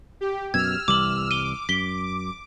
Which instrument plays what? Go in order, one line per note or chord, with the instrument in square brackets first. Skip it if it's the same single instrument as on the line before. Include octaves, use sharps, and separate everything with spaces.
[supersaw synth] G4
[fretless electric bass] F#2 B2 [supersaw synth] E6 F6 [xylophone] G#6
[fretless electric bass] C2 E3 G3 [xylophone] D6 F#7
[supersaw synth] D6 [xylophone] D#7 G7
[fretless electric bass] F#2 [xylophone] B6 G7